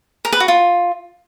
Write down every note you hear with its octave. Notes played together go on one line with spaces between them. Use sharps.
A#4
B4
F#4
F4